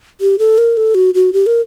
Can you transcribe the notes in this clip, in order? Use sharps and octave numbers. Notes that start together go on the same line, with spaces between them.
G4
A4
A#4
A4
F#4
F#4
G4
A#4